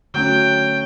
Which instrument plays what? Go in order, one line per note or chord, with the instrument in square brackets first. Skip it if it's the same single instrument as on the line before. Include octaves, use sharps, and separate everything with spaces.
[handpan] D3 A3 C#4 [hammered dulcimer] F#3 [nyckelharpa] G5